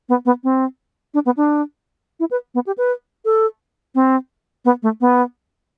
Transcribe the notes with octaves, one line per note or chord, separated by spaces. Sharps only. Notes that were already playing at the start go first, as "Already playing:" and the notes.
B3
B3
C4
D4
B3
D4
E4
B4
B3
G4
B4
A4
C4
B3
A3
B3